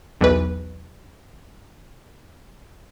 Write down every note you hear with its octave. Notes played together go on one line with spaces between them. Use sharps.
B1 E2 B4